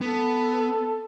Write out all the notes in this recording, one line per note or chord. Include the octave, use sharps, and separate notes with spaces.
B3 A4